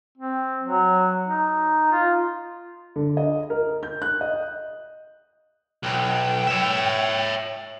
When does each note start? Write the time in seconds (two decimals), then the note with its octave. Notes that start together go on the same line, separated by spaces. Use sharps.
0.18 C4
0.63 F#3
1.28 D#4
1.92 F4
2.96 D3
3.17 D#5
3.50 A#4
3.83 G6
4.02 F#6
4.21 D#5
5.84 B1 G5
6.47 C#5 E5